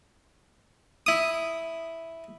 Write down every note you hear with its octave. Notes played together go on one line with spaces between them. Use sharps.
E4 D#6